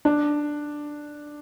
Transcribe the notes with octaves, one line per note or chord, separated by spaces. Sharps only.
D4